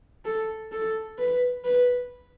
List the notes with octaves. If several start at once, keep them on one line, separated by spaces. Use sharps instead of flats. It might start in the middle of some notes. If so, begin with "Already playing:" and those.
A4
A4
B4
B4